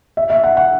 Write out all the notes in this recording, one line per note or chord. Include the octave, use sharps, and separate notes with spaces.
E5
E5
F#5
F#5